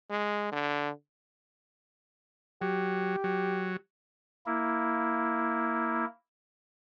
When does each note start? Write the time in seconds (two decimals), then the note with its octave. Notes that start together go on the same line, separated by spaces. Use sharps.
0.10 G#3
0.52 D3
2.62 F#3 G4
3.24 F#3
4.46 A#3 E4